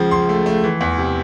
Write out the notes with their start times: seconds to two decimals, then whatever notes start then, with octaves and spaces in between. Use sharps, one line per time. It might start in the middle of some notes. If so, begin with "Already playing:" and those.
Already playing: C#2 C#3 F3
0.11 C#2 C6
0.29 A3
0.46 A3
0.64 E3
0.81 E2
0.98 C3